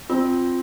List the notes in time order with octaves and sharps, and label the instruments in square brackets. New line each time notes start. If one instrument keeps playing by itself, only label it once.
[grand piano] C4 [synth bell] F4